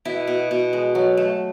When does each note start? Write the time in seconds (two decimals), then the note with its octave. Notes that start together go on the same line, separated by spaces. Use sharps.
0.05 B2 E4
0.27 B2
0.51 B2
0.73 G#3
0.95 F#3
1.17 A3